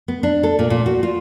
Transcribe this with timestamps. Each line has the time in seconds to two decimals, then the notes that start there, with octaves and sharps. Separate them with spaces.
0.08 B3
0.23 D4
0.43 A4
0.59 A#2
0.70 A#2
0.86 F#4
1.03 F4